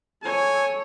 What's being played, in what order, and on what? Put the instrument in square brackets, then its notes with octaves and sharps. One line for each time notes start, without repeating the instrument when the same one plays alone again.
[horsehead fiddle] A4 C#5 [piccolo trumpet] G#5